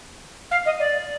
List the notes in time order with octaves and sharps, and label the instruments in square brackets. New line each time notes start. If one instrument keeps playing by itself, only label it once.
[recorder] F5
D#5
D5